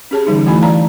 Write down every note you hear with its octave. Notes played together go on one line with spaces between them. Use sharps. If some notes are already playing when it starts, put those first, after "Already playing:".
C#4 G4 G#4 C#5 A5
D3 E3 G3 C#4 D#4
E3 A3 E4 F#4 G#5 B5
D5 F5 A5 A#5